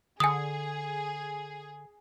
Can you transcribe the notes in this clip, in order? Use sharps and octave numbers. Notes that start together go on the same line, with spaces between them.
D3 G#4 G#5 D#6